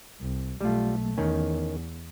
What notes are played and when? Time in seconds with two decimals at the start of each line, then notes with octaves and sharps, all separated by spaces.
0.21 C2
0.61 B1 G3 A3 F4
1.18 E2 D#3 C#4